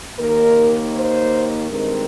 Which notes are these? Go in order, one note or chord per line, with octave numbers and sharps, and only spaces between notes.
D#2 D#3 A#3 A#4
C5
G2 D#3 G#3 C4 A#4